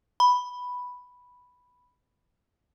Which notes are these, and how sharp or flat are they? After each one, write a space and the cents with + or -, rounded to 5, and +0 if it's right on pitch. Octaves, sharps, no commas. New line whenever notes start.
B5 +0